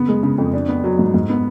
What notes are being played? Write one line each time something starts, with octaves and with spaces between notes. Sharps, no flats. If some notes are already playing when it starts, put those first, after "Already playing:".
Already playing: C#3 B3
G#3
C#3
F2
D4
B3
F#3
G#2
G#2
B3